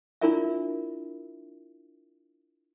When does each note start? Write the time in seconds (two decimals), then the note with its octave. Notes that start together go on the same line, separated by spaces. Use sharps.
0.21 D4 E4 F4 A#4 D5 E5